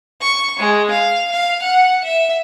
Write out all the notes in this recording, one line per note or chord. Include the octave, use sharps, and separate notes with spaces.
C#6
G#3
F5
F5
F#5
E5